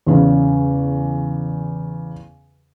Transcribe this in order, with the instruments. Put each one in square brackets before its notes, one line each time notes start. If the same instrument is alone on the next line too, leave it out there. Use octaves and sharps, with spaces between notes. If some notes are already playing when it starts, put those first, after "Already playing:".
[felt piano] E2 C#3